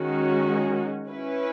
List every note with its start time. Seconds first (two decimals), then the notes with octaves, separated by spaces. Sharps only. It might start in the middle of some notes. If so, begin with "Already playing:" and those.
Already playing: D#3 G#3 C#4 F#4
1.09 C#4 E4 B4